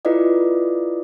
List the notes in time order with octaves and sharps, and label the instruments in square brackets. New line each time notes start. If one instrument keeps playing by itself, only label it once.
[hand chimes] E4 F4 A4 B4 D5 D#5